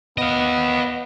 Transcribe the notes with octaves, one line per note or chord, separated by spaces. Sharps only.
B3 D#5 F5